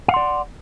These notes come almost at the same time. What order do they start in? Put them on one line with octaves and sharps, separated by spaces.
F5 F#5 C6 D5